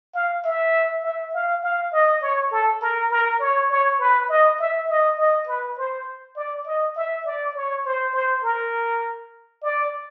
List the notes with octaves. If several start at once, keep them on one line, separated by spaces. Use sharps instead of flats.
F5
E5
E5
F5
F5
D#5
C#5
A4
A#4
A#4
C#5
C#5
B4
D#5
E5
D#5
D#5
B4
C5
D5
D#5
E5
D5
C#5
C5
C5
A#4
D5